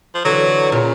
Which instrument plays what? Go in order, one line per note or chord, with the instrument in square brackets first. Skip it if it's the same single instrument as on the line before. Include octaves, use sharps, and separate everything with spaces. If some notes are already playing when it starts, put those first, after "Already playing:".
[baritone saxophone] F3
[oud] D3 E3 [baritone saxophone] F#3
[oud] A#2 [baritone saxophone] C#3